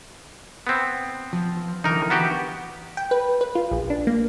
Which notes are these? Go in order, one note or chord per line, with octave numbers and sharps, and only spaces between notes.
B3 C4
F3
D3 E3 D#4 A#4
B3 F#4 G4
G5
B4
B4
F4
A#1
D4
A#3